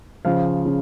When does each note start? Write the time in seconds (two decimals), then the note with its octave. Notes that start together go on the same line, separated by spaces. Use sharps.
0.25 C#3 F3 F5
0.66 C#3